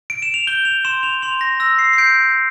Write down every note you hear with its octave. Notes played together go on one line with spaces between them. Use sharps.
D7
E7
F7
G6 G7
F7
C6 E7
F7
C6 F7
A#6
E6 A#6
C7
C7
G6 D7